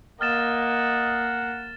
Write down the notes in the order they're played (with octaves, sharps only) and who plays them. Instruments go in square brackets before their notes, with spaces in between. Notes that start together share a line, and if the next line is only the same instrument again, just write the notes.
[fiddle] A#3 [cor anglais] D#5 [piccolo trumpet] F#5 [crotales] F6 A6 E7